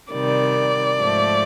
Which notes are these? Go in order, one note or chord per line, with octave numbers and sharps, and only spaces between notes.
C3 D#3 G3 D5
G#2 F3 A3